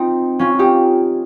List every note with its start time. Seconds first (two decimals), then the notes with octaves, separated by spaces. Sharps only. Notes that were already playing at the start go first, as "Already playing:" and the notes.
Already playing: C4 D#4 F4
0.39 C#4 F4
0.59 D#4 G4